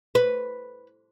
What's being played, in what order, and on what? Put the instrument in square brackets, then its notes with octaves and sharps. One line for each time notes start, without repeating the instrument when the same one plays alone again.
[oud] B4